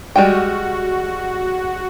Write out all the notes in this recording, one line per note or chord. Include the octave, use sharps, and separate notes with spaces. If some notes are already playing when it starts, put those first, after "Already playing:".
G3 G#3 F#4 G5